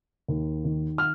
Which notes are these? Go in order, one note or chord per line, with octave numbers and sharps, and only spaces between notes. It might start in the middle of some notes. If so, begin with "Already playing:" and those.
D#2
D#3
F6